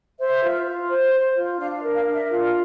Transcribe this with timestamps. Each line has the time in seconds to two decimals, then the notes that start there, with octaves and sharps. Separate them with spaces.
0.19 C5 E5
0.44 F4
0.66 F4
0.90 C5
1.14 C5
1.37 F4
1.60 D4 F5
1.78 E5
1.84 A#4
1.95 F5
2.07 D4
2.13 E5
2.30 F4 F5